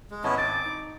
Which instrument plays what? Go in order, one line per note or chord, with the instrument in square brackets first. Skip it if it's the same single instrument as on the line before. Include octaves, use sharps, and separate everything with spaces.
[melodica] G#3
[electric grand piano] G#1 D#5 A5 [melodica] B3 C#4 E4
[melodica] D6 [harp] A6
[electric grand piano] D#4